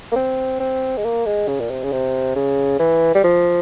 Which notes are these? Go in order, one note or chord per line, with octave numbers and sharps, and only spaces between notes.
A#3
C4
C4
G#3
A#3
G#3
C#3
A#2
C3
C#3
C3
C#3
E3
G3
F3